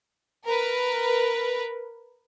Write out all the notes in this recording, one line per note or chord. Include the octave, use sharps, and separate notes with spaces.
A#4 B4